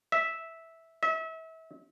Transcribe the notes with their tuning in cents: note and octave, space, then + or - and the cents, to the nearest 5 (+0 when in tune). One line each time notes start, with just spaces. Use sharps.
E5 -5
E5 -30